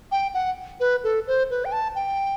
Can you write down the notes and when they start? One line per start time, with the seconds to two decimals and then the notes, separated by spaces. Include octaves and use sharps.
0.12 G5
0.34 F#5
0.80 B4
1.04 A4
1.27 C5
1.50 B4
1.65 G5
1.72 A5
1.95 G5